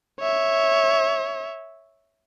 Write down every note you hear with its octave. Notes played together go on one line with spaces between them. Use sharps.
C#5 E5